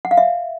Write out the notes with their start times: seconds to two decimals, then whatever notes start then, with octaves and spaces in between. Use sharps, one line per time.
0.05 F#5
0.11 F5
0.17 E5